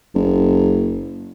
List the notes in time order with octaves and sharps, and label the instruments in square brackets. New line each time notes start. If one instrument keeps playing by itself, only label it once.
[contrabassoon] F#1